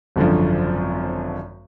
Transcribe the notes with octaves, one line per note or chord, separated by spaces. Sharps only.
G#1 F#2 D3 F3